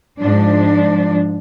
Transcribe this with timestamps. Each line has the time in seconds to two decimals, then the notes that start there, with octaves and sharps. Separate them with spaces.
0.19 G#2 F3 D4